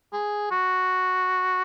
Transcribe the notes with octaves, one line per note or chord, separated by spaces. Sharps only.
G#4
F#4